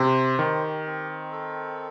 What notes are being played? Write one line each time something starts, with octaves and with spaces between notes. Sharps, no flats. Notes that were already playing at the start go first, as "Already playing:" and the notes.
Already playing: C3 C5
D#3 G4
C4
A4